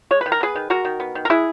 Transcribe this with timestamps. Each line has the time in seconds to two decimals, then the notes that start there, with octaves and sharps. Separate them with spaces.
0.11 G#3 C#5
0.21 D#3 B4
0.32 A#4
0.41 B3 G#4 B4
0.55 D#3
0.70 G#3 F#4 A#4
0.85 D#3
1.00 B3
1.15 D#3
1.25 A#4
1.30 G#3 E4 G#4